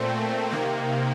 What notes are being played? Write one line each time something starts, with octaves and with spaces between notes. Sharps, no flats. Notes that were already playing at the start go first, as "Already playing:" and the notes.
Already playing: A#2 A3 C4
C3 D#3 A#3